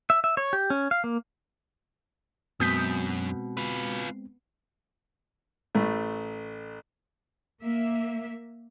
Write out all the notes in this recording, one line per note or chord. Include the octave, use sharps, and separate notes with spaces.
E5
E5
C#5
G4
C#4
F5
A#3
F#2 B2 G#3 B3 C4 D#6 G6 B6
F4 B4
A1 A3
A#3 E5